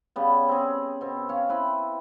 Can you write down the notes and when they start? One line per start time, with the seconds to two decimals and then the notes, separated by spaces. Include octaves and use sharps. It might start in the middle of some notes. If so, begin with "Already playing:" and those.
0.16 C#3 G3 B3
0.49 C4 G#4
1.01 B2 C4
1.29 C#4 C#5 F5
1.49 C4 E4 B4